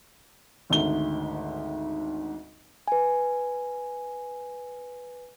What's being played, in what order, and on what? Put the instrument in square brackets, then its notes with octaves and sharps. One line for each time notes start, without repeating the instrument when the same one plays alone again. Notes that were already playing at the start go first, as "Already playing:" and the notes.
[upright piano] G#1 D2 G#2 G7
[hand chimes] B4 G#5